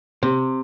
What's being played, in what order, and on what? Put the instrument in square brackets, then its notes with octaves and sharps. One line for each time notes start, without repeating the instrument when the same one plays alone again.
[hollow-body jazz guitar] C3